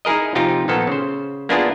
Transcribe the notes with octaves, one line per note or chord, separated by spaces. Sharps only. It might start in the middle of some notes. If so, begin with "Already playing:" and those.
D#4 E4 G#4 A#4 D#5
C3 F3 D#4 F4 G4
A#2 D#3 F3 B3 A4
C#3 C5
A#3 B3 D4 E4 F4 G#4